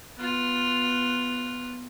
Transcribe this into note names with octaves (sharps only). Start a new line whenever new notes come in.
B3 F4